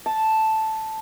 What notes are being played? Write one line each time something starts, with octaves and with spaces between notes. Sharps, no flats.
A5